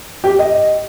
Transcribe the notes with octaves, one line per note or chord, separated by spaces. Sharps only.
G4
D#5